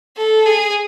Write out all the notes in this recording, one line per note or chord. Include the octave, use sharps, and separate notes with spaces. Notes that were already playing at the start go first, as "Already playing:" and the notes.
A4
G#4